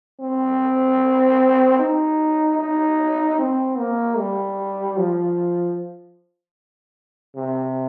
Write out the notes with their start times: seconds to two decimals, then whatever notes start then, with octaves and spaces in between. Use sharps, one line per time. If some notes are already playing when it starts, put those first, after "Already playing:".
0.20 C4
1.79 D#4
2.59 D#4
3.39 C4
3.78 A#3
4.18 G3
4.97 F3
7.36 C3